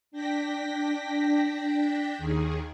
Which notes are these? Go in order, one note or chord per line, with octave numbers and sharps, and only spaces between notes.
D4 G5 A#6 B6
D#2 D#3 G#4